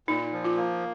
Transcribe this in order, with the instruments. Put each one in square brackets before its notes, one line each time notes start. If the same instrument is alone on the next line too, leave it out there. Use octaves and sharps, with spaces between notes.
[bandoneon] A#2 [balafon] D#4
[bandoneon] F3
[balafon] F4
[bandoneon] A#3